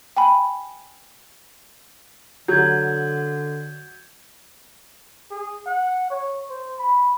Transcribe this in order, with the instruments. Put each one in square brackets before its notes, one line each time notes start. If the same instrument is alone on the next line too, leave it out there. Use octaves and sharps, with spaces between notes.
[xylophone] G5 G#5 B5
[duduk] D3 [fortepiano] F#3 [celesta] G6 G#6
[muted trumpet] G#4
F#5
C#5
C5
B5